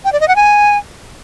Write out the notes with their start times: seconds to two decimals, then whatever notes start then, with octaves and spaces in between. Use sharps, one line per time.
0.05 G5
0.13 D5
0.20 D#5
0.28 F#5
0.36 G#5